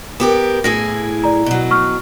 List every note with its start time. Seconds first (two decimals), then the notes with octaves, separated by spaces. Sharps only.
0.20 B3 G4 A#4
0.64 A2 E4 G#4 A#6
1.24 D5 A#5
1.46 B2 F#3
1.71 C#6 F6